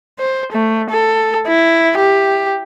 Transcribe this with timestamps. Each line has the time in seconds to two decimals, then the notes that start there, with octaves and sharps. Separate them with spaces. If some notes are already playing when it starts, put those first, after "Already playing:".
0.19 C5
0.53 A3
0.91 A4
1.47 E4
1.97 G4